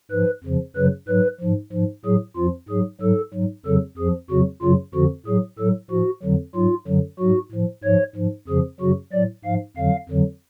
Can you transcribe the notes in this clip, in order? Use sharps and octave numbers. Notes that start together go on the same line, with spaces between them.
G#2 F3 B4
F2 C#3 F3
F#2 C#3 F#3 B4
G#2 F#3 B4
G#2 F3
G#2 F3
A2 F#3 G#4
F2 F3 F4
G#2 F#3 G#4
G#2 F#3 A4
G#2 F#3
F2 C#3 F#3 A4
F2 F3 G#4
F2 C#3 F#3 F#4
F#2 C#3 F#3 F4
F2 D3 F3 F#4
A2 F#3 G#4
A2 F#3 A4
A2 F3 F#4
F2 D3 F#3
G#2 F#3 F4
F#2 D3 F#3
G#2 F#3 F#4
A2 F3
G#2 F3 C#5
G#2 F3
F2 C#3 F3 G#4
F#2 C#3 F#3 F#4
A2 F#3 D5
G#2 F3 F5
F2 D3 F#3 F5
F2 D3 F#3